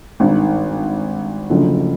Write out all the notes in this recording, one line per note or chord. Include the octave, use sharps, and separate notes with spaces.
G#1 G2 D#3
F#1 F#2 D3 F3 A3